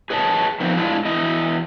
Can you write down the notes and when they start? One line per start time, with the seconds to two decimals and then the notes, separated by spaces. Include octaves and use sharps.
0.10 G#4 B4 C#5 D#5 A5
0.60 D#3 F3 B3 C4
0.77 A2 G#3 D4 E4 F4
1.05 E2 E4 D#5